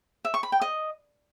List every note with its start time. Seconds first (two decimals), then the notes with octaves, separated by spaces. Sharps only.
0.25 E5
0.34 C#6
0.43 B5
0.52 G5
0.61 D#5